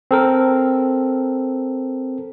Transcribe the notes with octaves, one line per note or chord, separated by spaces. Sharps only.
C4 A4 A#4